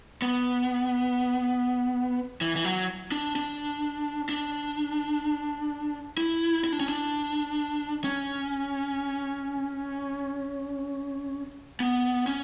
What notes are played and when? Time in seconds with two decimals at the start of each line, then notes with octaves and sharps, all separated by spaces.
0.22 B3
2.41 E3
2.56 E3
2.64 F#3
3.12 D4
3.36 D4
4.29 D4
6.17 E4
6.64 E4
6.72 D4
6.80 C#4
6.89 D4
8.04 C#4
11.80 B3
12.27 C#4